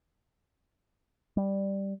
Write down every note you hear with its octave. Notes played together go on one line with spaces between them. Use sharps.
G3